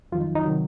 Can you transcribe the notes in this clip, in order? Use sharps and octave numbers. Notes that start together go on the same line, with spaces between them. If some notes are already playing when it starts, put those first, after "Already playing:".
F2 D#3 F#3 F4
D#4
D#4
C3 D#3 F#3